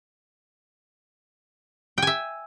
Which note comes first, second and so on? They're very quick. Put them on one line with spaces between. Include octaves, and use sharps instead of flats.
G5 G#5 E5